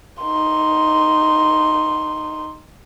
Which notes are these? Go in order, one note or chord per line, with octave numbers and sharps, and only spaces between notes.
D#4 C6